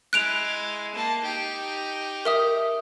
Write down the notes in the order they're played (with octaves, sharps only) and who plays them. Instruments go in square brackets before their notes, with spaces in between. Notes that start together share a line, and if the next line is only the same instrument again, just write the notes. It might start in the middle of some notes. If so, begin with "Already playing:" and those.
[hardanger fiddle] G#3 E4 [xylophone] F#6 D7 F7
[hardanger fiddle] A#3 A5
D#4 G4
[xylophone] A#4 E5 D#6